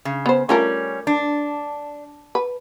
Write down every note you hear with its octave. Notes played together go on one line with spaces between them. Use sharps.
C#3
B3 C5
G3 A3 C#4 F4 A#4
D4
B4